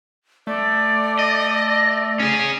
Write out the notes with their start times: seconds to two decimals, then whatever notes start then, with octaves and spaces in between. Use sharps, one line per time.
0.47 A3 D5
1.19 D#5
2.20 C#4 G#4